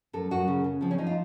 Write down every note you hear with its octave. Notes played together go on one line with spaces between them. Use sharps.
F#2 A4
F#2 F#4
C#3
C#3
F3 C4
C#4
F3 D#4
F4